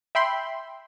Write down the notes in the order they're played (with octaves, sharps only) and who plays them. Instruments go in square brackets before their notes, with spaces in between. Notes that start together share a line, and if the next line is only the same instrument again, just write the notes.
[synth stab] E5 G5 B5 C6